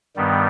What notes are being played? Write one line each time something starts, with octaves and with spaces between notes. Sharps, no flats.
G2 D#3 G3 B3